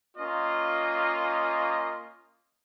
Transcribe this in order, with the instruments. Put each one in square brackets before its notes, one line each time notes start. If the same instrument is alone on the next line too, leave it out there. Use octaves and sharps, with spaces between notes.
[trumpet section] A#3 C#4 F4 D#5